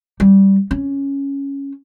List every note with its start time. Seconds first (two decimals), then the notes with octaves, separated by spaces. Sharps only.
0.20 G3
0.71 C#4